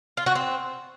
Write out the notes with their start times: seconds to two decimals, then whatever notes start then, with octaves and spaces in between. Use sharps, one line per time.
0.17 F4
0.26 F#4
0.35 C4